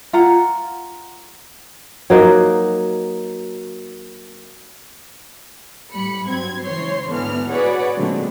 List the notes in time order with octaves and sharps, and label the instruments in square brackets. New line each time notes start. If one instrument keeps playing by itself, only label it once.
[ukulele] F4 F#5 A#5
[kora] F#3 A#3 D#4
[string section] A2 G3 B5 C#7
G2 F#3 C4 G#6
C#2 E3 C5 C#5 C6 C7
D2 G#2 D3 E3 B3 F6
F#4 G#4 B4 C#5 D5 F#5
A#2 D3 F#3 G#3 A3 C4